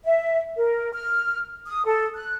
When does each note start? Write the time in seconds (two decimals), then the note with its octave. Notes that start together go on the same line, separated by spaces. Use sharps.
0.06 E5
0.57 A#4
0.93 F6
1.66 D#6
1.85 A4
2.15 F#6